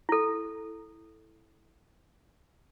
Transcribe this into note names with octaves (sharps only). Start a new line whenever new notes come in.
E4 A4